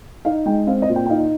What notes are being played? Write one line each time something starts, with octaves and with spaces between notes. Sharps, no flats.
D#4 F5
G#3 G5
C4 F5
D#5
A#2
G5
G5
D#4 F5